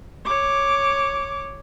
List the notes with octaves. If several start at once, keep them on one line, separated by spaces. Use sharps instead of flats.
C#5 D6